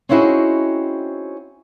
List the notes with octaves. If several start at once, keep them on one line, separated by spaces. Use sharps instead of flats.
C4 C#4 D#4 E4 F#4 G#4